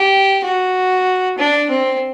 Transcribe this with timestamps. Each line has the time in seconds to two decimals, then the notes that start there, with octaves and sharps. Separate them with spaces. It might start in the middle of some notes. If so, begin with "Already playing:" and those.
Already playing: G4
0.44 F#4
1.38 D4
1.70 C4